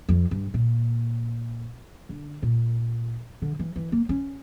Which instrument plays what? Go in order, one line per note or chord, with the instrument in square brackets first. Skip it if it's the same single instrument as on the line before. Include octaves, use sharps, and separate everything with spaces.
[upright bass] F2
G2
A#2
D3
A#2
D3
E3
E3
A#3
C#4